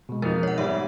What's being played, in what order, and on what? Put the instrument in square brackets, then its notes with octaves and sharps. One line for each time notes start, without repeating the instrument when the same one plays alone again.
[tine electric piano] B2 G#3
[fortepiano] F2 D#4 [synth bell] A#4
[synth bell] C#5 F#5
[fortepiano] G#2 G3 [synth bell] E5